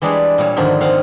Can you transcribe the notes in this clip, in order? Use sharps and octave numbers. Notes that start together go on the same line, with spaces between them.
E3 G3 G#3 D4 G#4 B4
A#2 G3 C#5
G#2 D3 D#3 F3
C4 F5 F#5